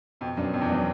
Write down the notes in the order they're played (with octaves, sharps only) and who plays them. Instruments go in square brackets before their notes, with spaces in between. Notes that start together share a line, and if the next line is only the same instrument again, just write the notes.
[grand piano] F2 [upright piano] B2
[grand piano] F#2 [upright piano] F#3 B3 D4
[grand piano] F2 [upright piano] B2
[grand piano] E2
[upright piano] F#3 B3 D4